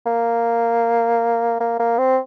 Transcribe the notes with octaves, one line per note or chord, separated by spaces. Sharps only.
A#3
A#3
A#3
C4